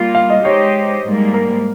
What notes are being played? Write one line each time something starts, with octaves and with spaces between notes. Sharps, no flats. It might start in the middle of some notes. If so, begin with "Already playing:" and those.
Already playing: G3 A#3 F4
F5
D#5
G#3 D#4 G4 C5 C#5 D#5
G#2 G3 A#3
A#4